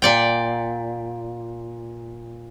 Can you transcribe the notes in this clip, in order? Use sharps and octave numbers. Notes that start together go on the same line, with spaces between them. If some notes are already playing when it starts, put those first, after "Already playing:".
A#2 D5 G5